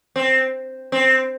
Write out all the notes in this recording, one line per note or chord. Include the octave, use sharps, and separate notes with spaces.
C4
C4